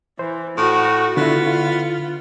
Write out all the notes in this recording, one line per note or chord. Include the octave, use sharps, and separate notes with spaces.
E3 C5
A2 F#4
D3 B3 E4 F4